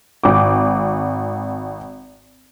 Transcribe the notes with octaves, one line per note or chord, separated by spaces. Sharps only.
G#1 D6